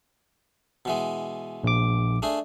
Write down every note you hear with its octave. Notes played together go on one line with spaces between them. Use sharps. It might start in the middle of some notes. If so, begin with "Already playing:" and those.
B2 E3 G#3
A#1 D6
A3 D4 G#4